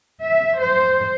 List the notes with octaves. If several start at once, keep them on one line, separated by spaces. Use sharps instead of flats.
E5
C5